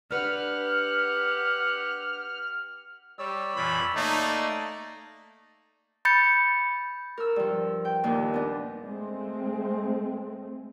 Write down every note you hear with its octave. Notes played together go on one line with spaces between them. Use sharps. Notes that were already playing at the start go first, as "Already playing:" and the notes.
D4 G4 B4 F#5 F6
G3 C#5 D5 E6
F2 A#2 E3 B5
A3 A#3 D#4 A4 D5
B5 G6 A6 C#7
A#4 E6
G2 F3
G5
D#2 A#2
B3 D4
G#3 A3 C4